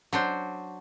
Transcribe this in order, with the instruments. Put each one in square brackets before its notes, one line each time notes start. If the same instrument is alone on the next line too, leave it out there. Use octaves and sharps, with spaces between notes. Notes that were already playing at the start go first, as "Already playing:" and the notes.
[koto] F#3 D4 C5